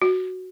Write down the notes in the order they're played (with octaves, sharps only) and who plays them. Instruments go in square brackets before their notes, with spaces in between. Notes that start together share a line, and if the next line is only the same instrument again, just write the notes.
[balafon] F#4